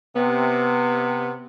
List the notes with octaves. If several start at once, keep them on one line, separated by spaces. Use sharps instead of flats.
C3 B3